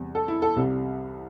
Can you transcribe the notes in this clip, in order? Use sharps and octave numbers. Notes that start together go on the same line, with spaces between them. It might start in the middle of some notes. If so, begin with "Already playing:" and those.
Already playing: E2 C3 G3
A4
E4
A4
C2 C3 G3